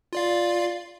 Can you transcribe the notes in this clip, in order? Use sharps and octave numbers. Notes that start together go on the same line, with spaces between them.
F4 D5 F5